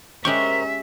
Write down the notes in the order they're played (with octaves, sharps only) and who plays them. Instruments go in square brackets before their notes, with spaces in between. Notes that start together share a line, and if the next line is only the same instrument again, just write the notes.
[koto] G#3 C#4 G4 [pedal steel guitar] A#4 C5 C#6 [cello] E5